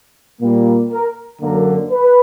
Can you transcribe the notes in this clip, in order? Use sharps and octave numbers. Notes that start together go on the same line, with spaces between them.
A#2 G3 A#3
A#4
F#2 D3 F#3 A#3 A#4
B4